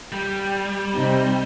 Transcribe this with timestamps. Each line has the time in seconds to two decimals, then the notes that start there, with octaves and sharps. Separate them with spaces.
0.12 G3
0.94 C3 D#4